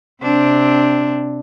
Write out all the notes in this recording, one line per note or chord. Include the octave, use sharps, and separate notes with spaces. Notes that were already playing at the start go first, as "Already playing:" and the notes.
C3 C4 D4